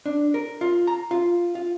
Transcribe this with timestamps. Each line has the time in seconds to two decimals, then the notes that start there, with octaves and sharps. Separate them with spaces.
0.06 D4
0.34 A#4
0.61 F4
0.87 A#5
1.11 F4
1.55 F4